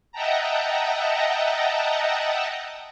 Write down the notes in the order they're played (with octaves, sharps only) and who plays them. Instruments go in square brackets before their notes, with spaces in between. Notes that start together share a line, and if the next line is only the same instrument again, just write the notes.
[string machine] D#5 E5 F#5 G5 A5 A#5